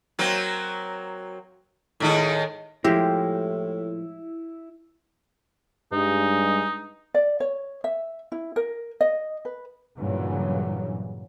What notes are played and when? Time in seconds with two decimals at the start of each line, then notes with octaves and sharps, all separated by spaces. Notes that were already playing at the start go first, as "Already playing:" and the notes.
0.19 F#3 A#3 C4
2.00 A2 D#3 G#3
2.84 A2 F3 G#3 E4 G4
5.93 G2 G#3 D#4
7.14 D5
7.40 C#5
7.84 E5
8.32 E4
8.56 A#4
9.01 D#5
9.45 B4
9.98 G2 A#2 C#3 E3 F#3